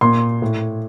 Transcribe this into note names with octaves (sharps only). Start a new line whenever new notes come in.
A#2 C6
A2